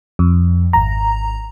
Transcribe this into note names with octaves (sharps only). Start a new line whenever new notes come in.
F2
G#1 A#5